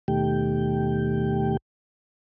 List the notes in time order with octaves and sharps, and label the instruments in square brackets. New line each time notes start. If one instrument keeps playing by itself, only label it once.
[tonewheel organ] D#2 B2 D#3 A3 G4 G5